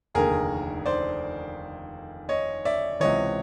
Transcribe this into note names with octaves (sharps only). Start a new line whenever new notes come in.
F1 D#2 D3 G#4 A#4
C5 D5
C#5 D#5
D5 E5
C#2 C3 E3 C#5 D#5